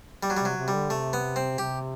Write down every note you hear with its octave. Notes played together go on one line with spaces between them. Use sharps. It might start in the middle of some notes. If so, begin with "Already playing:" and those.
G3
F#3
G3
C3
F#3
C3
G3
D3
C3 A3
B3
C4
C3 G4